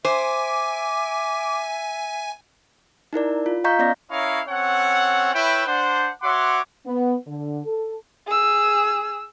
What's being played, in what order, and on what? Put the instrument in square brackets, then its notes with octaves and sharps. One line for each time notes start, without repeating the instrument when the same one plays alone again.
[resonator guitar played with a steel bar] C5 [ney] E5 [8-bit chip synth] G#5 [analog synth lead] D6
[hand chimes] D#4 E4 A#4 D5
F4
D#5 F5 A#5 C#6 G6 B6
B3 C#4 D5 D#5 F5 A#6
[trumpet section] C#4 E4 A#4 C#5 D#5 F5
C4 C#4 A4 C#5 F#5
E4 B4 C#5 E5 G5
D4 C5 F#5
F#4 C#5 E5 F#5 C6 D6
[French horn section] B3
D3
A4
[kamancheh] G#4 E6